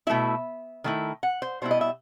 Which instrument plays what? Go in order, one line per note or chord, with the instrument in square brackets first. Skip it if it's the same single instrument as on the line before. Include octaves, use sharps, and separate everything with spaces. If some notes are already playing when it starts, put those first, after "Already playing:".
[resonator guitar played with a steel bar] B2 A3 E4 E5
D#3 A3 E4
F#5
C5
B2 G3 B3 E4 C5
D#5
E5